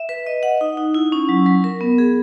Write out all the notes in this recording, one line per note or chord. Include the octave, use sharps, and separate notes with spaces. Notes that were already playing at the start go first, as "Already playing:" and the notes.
Already playing: E5
B4
D#5
F#5
D#4
D#4
E4
C#4
F#3
F#3
A#4
B3
G#4